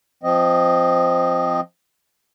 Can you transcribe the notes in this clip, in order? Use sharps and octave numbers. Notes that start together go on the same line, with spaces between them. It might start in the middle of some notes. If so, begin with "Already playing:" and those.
F3 C4 D#5